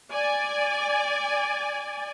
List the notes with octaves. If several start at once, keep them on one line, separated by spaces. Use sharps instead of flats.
D5 G#5